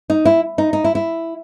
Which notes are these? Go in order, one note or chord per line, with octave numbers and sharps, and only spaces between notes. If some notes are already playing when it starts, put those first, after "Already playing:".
D#4
E4
D#4
D#4
E4
E4